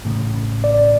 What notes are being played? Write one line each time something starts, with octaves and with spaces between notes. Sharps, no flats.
A1 A2 C#3
D5